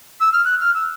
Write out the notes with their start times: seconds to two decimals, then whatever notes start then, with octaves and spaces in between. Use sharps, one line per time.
0.20 E6
0.32 F6
0.45 F#6
0.60 F6
0.74 E6